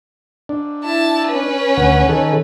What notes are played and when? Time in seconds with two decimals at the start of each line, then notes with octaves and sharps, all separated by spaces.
0.49 D4
0.84 E4 A5
1.28 C#4 B4
1.77 D2 F#5
2.09 D#3 G#4 A4